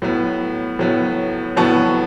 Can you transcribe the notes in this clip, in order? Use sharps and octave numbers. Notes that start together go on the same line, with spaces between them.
A2 F#3 B3
A2 F#3 B3
A2 F#3 B3 A5 C#6